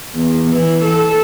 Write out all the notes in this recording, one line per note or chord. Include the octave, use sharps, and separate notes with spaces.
E2
E3
A4